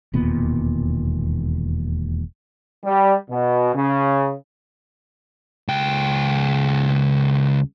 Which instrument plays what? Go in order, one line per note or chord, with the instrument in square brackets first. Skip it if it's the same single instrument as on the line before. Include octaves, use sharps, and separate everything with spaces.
[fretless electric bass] E1 D#2 A#2 B3
[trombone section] G3
B2
C#3
[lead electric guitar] C#2 G5